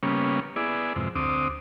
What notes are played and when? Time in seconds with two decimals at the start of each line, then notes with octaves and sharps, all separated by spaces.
0.03 C#3 G3 A#3 B3 C#4
0.56 B3 E4 G#4 D5
0.96 F2 G#2 C3
1.15 D2 C4 D6 D#6